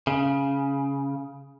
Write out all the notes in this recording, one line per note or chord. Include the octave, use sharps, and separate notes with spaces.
C#3